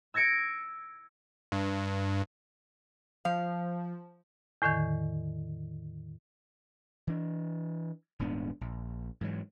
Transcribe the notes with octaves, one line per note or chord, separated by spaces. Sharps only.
E6 G#6 A#6 C#7 D7
G2
F3 F5
E2 A2 D3 D#3 G#6
E3 D4
D#1 G#2 B3 D4
A#1
G#2 E3 F#3